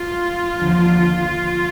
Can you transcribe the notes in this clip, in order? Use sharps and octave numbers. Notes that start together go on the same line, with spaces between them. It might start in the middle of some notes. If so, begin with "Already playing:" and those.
Already playing: F4
D#2 D3 F3